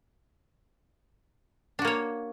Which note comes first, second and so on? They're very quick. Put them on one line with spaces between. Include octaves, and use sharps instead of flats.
D4 F#4 A#3 C#5